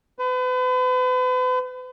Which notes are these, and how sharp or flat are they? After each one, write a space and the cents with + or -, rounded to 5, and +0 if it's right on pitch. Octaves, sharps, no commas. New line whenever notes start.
B4 +40